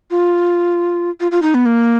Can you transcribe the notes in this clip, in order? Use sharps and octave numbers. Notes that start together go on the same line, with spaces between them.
F4
F4
F4
D#4
B3
A#3